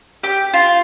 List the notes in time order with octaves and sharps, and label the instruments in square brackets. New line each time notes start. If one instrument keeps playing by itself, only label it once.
[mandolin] G4
F4